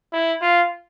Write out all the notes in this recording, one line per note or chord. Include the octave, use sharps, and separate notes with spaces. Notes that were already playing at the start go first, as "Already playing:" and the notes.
E4
F4